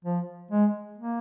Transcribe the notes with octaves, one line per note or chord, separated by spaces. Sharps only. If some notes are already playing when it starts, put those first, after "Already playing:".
F3
G#3
A#3